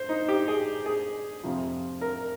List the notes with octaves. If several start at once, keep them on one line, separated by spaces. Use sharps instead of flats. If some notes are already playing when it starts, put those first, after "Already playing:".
Already playing: C5
D#4
G4
G#4
G#4
F2 C3 F3
A#4